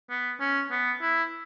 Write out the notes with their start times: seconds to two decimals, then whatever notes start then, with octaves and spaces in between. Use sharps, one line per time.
0.10 B3
0.40 C#4
0.71 B3
1.02 E4